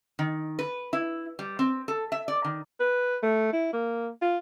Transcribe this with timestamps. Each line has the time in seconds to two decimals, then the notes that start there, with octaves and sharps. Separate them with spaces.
0.19 D#3
0.59 B4
0.93 E4
1.39 G3
1.59 C4
1.88 A4
2.12 E5
2.28 D5
2.44 D#3
2.80 B4
3.23 A3
3.53 E4
3.73 A#3
4.22 F4